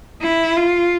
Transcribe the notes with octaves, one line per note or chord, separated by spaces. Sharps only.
E4
F4